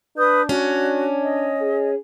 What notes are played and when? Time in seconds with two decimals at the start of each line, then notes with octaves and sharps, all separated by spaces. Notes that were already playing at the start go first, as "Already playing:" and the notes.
0.17 D4 B4 D#6 G6
0.49 C#4 F#4
1.21 D#5
1.61 G#4